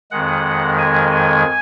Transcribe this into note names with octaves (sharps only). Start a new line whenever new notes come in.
F2 D#3 G#3 F#5
G#5
G#5